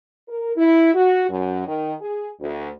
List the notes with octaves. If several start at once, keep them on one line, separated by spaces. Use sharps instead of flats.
A#4
E4
F#4
F#2
D#3
G#4
D2